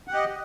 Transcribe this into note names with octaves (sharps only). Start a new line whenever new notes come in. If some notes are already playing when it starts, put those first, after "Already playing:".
G4 D#5 F#5